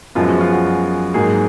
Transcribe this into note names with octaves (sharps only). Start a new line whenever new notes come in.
F#2 F3 G#3 B3 F4
F#4
F4
F#4
G#2 F#3 A#3 G#4